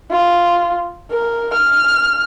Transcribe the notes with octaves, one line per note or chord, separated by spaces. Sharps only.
F4
A#4
F6